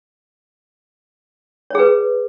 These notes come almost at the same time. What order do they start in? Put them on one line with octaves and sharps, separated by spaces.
C#5 G#4 B4